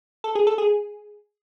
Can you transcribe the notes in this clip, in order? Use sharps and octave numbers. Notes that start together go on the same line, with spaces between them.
A4
G#4
A4
G#4